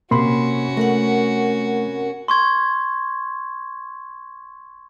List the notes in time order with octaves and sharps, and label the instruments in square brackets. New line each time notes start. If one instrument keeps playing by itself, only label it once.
[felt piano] C3 B5 [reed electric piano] A#3 C6 [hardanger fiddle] C#4 F#4
[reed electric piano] A3 [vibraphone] A#4 F#5
[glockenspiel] C6 C#6 G#6